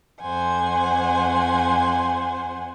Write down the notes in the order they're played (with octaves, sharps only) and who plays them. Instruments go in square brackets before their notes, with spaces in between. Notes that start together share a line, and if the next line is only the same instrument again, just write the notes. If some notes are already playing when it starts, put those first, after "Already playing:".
[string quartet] F2 C5 F#5 G#5